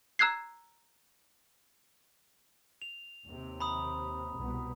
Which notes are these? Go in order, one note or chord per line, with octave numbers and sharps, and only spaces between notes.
A#5 E6 F#6 G#6 C7
F7
D#2 C3
A#5 B5 D#6
C2 B2 B3